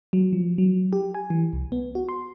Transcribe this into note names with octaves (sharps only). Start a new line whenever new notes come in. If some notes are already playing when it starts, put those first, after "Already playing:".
F#3
F3
F#3
G4
G#5
E3
C2
B3
F#4
C6